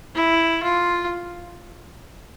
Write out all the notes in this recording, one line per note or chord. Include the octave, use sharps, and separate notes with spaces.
E4
F4